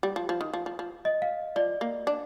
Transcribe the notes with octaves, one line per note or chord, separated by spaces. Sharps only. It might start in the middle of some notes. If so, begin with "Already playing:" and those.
G3
F3
F3
D#3
F3
F3
F3
D#5
F5
F3 D5
A#3
D4